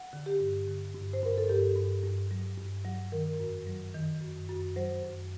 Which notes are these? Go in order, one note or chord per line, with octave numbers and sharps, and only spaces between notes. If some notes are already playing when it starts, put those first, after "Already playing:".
Already playing: F#5
D3
G4
G2
D3
G2
C5
G2 A#4
A4
G2 G4
G2
G2
F#3
G2
F#3
D#3 A#4
F#2
F#3
D#3
F#2
F#2
F#3 C5
F#2